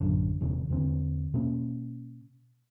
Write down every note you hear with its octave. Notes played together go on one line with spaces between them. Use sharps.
A1 F#2 D3
D#1 E2 C3 D#3
E2 D3 B3 C4
B2 A#3 C#4